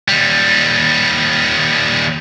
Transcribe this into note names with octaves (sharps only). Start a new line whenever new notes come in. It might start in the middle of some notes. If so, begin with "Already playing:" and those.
D#2 G3